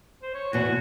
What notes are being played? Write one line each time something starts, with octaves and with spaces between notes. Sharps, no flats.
C5
C#5
E2 B2 F#4